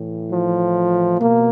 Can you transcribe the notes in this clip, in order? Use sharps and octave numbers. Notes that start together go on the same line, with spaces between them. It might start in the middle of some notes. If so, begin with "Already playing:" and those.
Already playing: A2 E3
F3
B2 A#3